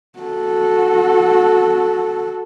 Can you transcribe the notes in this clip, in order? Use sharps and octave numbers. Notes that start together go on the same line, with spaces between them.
F#4 A4